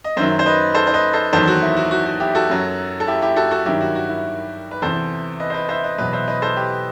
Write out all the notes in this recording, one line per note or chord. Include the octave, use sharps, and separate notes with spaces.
D#5
F#2 D#3 F#3 C5 E5
C5
B4 D#5
A4 C5
C5
B4 D#5
A4 C5
E2 D#3 F#3 A4 C5
F#4
E4
F#4
F#4
F#4
E4 G4
F#4 A4
F#2 F#3
A4
E4 G4
E4 G4
F#4 A4
F#4 A4
G2 D#3 F#3 E4 G4
F#4
F#4
E4
B4
E2 C3 E3 A4 C5
B4 D#5
C5
B4 D#5
C5 E5
B4 D#5
E2 B2 F#3 B4 D#5
C5 E5
B4 D#5
A4 C5
G4 B4